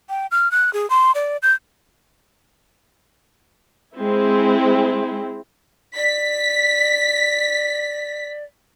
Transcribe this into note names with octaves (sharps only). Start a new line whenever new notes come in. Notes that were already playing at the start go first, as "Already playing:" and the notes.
G5
F6
F#6
G#4
C6
D5
G6
G#3 C4 E4
D5 B6